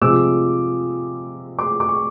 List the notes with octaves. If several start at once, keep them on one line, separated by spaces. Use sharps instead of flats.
C3 F3 G#3 D6 E6
C6 D6
D6
C#6